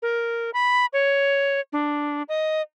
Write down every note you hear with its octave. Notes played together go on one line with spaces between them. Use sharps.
A#4
B5
C#5
D4
D#5